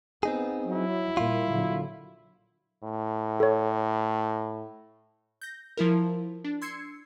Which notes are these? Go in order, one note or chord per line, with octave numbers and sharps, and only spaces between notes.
B3 C4 D#4 G#4
F#3 E4
A#2 G3 A#3 F4
A#2 D3 F#3
A2
A4 C#5
G6 A#6
F3 E4 A#4
D4
C6 E6 G#6 C7 C#7